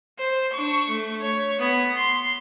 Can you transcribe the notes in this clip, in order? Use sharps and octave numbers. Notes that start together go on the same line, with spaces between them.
C5
D4 C#6
A3
C#5
B3
C6